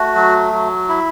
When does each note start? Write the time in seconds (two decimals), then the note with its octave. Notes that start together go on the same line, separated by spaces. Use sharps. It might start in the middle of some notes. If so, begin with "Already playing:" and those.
Already playing: A3 F#4
0.16 F#3
0.52 F#3
0.89 E4